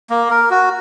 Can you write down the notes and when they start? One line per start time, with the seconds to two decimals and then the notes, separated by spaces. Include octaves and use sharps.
0.10 A#3
0.30 A#4
0.50 F#4